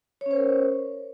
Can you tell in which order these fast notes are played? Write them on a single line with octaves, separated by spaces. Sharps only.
C#5 C#4 C5 A#4